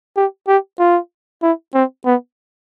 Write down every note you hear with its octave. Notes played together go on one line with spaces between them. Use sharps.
G4
G4
F4
E4
C4
B3